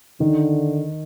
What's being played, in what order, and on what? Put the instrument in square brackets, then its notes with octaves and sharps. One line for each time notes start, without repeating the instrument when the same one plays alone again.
[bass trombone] D3 [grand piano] D#3